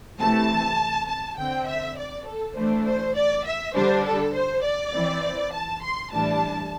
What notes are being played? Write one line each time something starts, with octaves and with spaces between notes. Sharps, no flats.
C3 E3 A3 A5
A5
D3 C4 G5
E5
D5
A4
E3 A3 D4 C5
C5
D5
E5
D3 G3 D4 C5
A4
C5
D5
E3 C4
A5
C6
A2 E3 G3 D4 A5